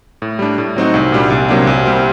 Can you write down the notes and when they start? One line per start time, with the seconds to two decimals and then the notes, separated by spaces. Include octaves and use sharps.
0.22 A2
0.39 G3 D4
0.58 A2
0.77 F#3 C4 D#4 F#4
0.94 C2
1.12 A#2 G3 D4
1.30 C2
1.48 C3 F#3 A#3 D4
1.67 C2
1.86 C3 G3 C4